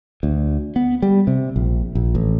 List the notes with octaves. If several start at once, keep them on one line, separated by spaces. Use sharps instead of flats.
D2
B3
G3
C3
A#1
A#1
A1